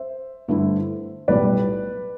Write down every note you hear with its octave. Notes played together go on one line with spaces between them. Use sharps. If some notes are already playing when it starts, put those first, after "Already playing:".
Already playing: C5 E5
G2 D3 A3 E4
B1 A2 G3 B4 D5